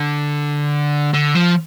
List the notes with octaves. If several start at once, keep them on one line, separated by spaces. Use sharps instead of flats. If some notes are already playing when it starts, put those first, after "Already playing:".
Already playing: D3
D3
F3